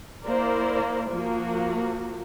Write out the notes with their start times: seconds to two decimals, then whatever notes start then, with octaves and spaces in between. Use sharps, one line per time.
0.25 A#3 E4 A#4 C5 D5
1.11 F3 A#3 F#4